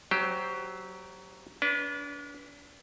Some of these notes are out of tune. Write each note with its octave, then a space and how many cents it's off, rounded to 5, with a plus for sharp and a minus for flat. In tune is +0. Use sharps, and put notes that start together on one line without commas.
F#3 +15 G4 +0 C5 -5
D4 -35 B4 -15